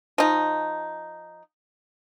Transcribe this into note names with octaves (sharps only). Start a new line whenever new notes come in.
F3 D#4